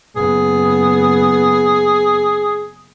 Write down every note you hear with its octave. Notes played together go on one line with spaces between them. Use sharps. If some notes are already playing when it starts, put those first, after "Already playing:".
F#1 B3 G#4